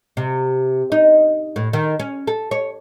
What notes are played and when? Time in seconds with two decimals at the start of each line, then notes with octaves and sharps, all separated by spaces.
0.17 C3
0.92 D#4
1.56 A2
1.73 D#3
2.00 C#4
2.27 A4
2.51 C#5